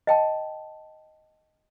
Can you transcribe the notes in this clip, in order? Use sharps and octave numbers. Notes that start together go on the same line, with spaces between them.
D#5 G5 A5